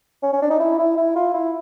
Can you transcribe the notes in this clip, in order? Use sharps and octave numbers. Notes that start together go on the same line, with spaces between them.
C#4
C#4
D4
D#4
E4
E4
E4
F4
E4